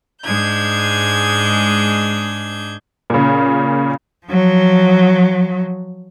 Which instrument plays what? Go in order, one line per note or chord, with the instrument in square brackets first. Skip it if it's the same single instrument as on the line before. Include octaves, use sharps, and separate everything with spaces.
[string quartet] G#2 G#3 D4 G6 G#6
[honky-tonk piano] A#2 C#3
[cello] F3 F#3